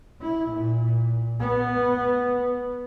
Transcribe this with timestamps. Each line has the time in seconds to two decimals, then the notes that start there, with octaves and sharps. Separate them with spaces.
0.21 E4
0.51 A#2
1.40 B3